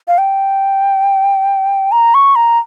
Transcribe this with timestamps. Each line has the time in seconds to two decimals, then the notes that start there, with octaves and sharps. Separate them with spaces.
0.08 F5
0.18 G5
1.92 A#5
2.14 C#6
2.36 A#5